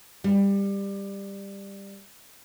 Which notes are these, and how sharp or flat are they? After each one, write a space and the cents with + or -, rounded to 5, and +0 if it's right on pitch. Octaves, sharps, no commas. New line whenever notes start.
G3 +15